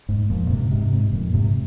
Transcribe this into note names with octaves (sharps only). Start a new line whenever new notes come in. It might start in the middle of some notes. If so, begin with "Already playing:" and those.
G#2
F2 A#2
G#2 C3
G#2 C3
G#2
F2 A#2
G#2 C3